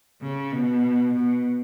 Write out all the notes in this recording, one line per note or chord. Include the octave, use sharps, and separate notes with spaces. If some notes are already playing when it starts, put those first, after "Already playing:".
C#3
B2
B2